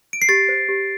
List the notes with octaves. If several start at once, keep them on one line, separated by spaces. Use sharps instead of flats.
D7
C7
G4 A6
C5
G4